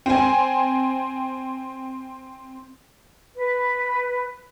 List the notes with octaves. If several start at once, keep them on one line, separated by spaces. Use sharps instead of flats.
C4 G#5
B4